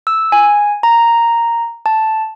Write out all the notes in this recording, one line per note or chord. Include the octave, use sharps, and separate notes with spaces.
E6
G#5
A#5
A5